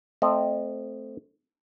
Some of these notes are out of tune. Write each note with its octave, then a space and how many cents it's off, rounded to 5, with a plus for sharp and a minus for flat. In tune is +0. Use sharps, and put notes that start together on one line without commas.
A3 +0 C4 +0 D#5 -30